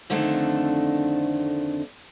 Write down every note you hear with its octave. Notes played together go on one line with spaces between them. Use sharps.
F2 D3 D#3 A3 C4 D4